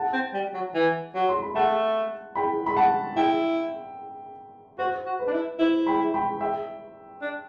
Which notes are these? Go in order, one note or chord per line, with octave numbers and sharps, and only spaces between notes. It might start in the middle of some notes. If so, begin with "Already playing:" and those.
Already playing: F#5 A5
C4
G3
F#3
E3
F#3
C6
B5
A3 F#5 A5
G5 B5
B5
F#5 A5
E4 E5 G5
F#4 C5
F#4
B4
D4
E4
E4 C5
G5 B5
G5 B5
E5 G5
D4